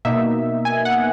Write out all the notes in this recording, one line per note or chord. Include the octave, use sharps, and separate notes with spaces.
B2 A#3 D#4 E5
G#5
F#5